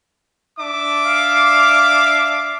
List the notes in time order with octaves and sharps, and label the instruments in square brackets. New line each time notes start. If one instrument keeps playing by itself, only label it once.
[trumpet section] D4 E5 D6
[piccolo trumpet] F5